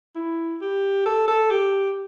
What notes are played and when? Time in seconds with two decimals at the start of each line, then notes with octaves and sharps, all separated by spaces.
0.15 E4
0.61 G4
1.05 A4
1.28 A4
1.50 G4